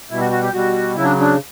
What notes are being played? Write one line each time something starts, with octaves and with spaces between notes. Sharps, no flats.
B2 G3 E4
F#4
F#4
G4
B2 G3 F#4
C#3 F#3 E4
D4
D4